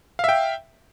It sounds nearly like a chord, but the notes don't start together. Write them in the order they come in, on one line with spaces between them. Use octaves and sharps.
F5 E5 G5